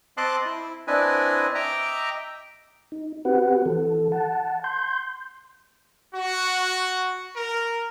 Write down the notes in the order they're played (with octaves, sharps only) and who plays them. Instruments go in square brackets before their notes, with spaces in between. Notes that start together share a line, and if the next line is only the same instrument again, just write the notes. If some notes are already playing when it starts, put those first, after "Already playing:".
[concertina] C4 D#5 A5 C6 D6 F#6
E4
C4 D4 E4 B4 D#5 G#5
D#5 E5 G5 A#5 D6
[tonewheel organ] D#4
C4 F#4 G4 B4 F#5
E3 A4
F#5 A5
C6 G6
[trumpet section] F#4
A#4